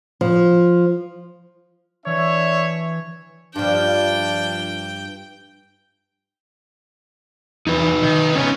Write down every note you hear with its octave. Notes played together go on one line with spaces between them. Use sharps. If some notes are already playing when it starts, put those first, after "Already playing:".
F3
E3 D4 C#5 E5
G2 F3 D4 G5
E2 D#4 B4
D#3
C#2 B3 C#4